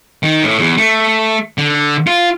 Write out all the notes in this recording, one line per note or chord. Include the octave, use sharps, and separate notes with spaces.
D#3
A2
E2
A3
D3
F4